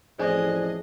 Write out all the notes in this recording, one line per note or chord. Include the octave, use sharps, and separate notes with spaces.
A1 F2 A2 G#4 C5 D5 D#5 G#5